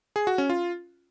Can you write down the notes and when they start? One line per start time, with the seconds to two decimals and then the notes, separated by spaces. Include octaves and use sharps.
0.16 G#4
0.27 F#4
0.38 C#4
0.50 F4